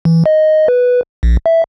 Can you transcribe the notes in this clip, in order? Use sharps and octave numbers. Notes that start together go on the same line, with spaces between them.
E3
D#5
B4
A#1
E5